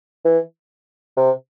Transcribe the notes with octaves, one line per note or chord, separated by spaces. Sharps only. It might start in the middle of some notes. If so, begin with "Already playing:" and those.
E3
C3